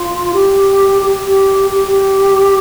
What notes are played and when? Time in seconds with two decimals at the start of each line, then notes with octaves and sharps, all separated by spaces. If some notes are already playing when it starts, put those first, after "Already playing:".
Already playing: F4
0.34 G4
1.02 G4
1.27 G4
1.71 G4
1.88 G4